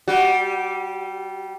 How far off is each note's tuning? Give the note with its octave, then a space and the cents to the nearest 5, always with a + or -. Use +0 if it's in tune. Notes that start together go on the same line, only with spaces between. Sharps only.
G3 -20 F#4 +5